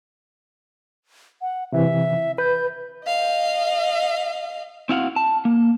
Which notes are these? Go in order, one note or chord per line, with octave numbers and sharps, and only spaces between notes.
F#5
C3 E3 E5
B4 G6
D#5 F5
C4 E4 F#4 F5 F#5
A5
A#3